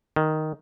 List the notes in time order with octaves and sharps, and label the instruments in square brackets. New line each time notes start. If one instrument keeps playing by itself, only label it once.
[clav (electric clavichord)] D#3